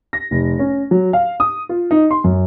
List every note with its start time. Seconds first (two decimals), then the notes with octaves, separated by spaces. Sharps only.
0.13 A#6
0.31 F1
0.59 C#4
0.91 F#3
1.13 F5
1.40 D#6
1.69 F4
1.91 D#4
2.11 C6
2.24 F#2